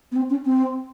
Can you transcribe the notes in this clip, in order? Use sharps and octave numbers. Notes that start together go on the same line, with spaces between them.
B3
C4
C#4
C4